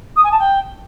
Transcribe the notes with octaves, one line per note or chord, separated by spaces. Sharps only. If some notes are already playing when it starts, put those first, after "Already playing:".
D#6
G#5
A5
G5